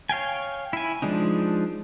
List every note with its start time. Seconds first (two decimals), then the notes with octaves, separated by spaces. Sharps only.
0.09 C#5 F5 G5 G#5
0.73 E4 G#5
1.02 F3 G#3 D4 D#4